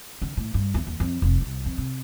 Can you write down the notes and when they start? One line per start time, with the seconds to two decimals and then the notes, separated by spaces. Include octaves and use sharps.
0.22 D3
0.37 A2
0.54 G2
0.74 E2
0.87 D#2
1.00 F2
1.22 F1
1.41 C2
1.66 F2
1.78 C3